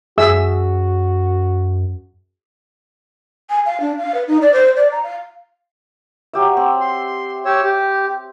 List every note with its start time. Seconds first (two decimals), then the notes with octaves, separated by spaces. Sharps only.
0.18 F#2 F#4 G#4 E5 E6
3.49 G#5
3.66 F5
3.81 D4
3.98 F5
4.14 B4
4.28 D#4
4.42 D5
4.53 C5
4.77 D5
4.92 A#5
5.03 F5
6.33 F#3 G4 E5
6.57 C4
6.80 C6
7.45 G4 C#5 E6
7.63 G4